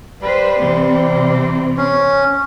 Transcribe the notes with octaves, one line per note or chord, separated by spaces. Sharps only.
G3 B4 C5
C3 E3 C4
C#4